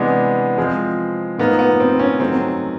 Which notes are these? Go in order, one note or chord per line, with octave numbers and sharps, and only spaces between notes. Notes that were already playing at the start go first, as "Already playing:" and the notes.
Already playing: C3 E3 G#3 B3 D4
F3 G#3 C4
A2 F3 A#3 B3 D#4
B3
C4
C#4
D#3 F#3 A3 C4